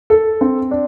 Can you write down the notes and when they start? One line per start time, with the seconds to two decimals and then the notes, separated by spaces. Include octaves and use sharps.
0.10 A4
0.41 C4
0.71 D4